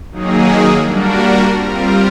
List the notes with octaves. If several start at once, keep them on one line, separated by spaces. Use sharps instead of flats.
D#3 F#3 A#3 D#4 G#4
G3 A#3 D4 F#4 A#4
G3 C4 F4 A#4